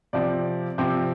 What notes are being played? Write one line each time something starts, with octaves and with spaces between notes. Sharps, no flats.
C3 F3 C4 D5
C3 F3 C4